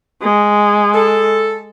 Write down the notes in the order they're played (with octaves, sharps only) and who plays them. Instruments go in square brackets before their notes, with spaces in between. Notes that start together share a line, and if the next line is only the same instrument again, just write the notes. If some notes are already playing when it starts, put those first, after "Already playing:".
[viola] G#3
[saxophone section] A4